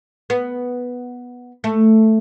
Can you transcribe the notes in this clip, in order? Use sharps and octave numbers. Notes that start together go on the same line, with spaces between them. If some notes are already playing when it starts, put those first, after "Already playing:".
B3
A3